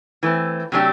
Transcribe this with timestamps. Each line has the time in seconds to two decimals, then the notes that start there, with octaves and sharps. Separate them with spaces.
0.23 E3 A3 C4
0.72 C3 F#3 A3 D4 G4